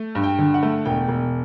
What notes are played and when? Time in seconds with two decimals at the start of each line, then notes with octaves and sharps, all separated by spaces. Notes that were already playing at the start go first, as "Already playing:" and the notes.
Already playing: A3
0.15 G2
0.23 G5
0.39 D3
0.54 F#5
0.63 A3
0.85 E1 G5
1.08 E1